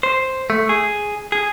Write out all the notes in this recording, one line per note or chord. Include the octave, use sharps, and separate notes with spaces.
C5
A3
G#4
G#4